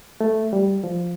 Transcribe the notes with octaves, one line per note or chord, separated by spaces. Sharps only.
A3
G3
F3